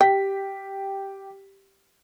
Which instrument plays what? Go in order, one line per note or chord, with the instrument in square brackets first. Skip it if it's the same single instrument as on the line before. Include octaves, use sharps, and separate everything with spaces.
[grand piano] G4 B6 [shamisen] G5